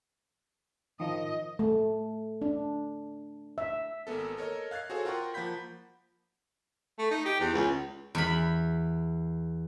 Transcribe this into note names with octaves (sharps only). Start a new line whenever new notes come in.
D#3 F3 D#5
A3
D4
E5
G#1 A#3 B3 A4
A4 A#4 C#5 D#5
F5 F#6 G#6 A6 C7
F#4 G#4 A4 C5 C#5
F4 A#4 F#5 G5 C6 C#6
F3 A#3 F#5 B5 G6 B6
A3
D#4
G4
E2
C#2
E2 B5